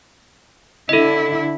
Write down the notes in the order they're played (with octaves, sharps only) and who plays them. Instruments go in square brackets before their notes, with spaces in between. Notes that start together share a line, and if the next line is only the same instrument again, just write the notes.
[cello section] D3 E4 [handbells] A4 D#5